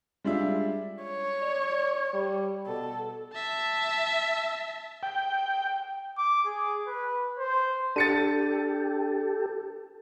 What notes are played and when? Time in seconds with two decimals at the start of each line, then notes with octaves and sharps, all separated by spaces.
0.24 G3 G#3 D4 F4 E5
1.03 C#5
1.42 D5
2.14 G3
2.67 B2 A4
3.33 E5 A5
5.03 G5
6.18 D6
6.46 G#4
6.87 B4
7.39 C5
7.96 D4 G4 A4 A6 C#7 D#7